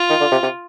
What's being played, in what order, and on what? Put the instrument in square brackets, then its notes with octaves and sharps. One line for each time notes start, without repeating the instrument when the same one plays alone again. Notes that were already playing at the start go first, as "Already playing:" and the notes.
Already playing: [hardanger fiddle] F4
[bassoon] D#3
D3
C3
C3